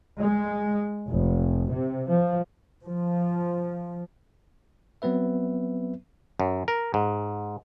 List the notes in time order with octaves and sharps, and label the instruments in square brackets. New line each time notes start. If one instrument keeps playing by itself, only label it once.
[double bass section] G#3
F1
C3
F3
F3
[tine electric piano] F#3 B3 C4 B4 E5
[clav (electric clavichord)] F#2
A#4
G#2